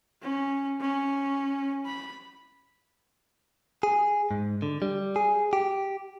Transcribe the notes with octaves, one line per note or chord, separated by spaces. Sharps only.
C#4
C#4
B5
G#4
G#2
D3
G3
G#4
G4